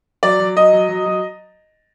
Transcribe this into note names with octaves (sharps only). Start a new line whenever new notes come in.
F#3 D5
F#3
F#3 D#5
F#3
F#3
F#3